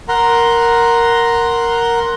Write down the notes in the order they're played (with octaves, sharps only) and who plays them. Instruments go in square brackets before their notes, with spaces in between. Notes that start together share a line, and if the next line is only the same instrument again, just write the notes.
[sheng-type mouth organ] A#4 F#5 A#5 C6